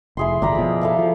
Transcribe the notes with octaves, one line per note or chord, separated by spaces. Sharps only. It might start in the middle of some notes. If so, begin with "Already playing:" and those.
F1 E4 G#4 C6
G1 D5 A#5 B5
B2 F3
E4 A4 F5
F3